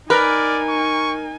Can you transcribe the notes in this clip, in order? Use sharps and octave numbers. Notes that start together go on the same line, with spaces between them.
D#4 A#4 B4 D5 G#5
C#6